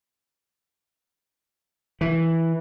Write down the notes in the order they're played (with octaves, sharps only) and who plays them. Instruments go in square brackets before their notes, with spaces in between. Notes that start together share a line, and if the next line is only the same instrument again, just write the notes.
[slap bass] E3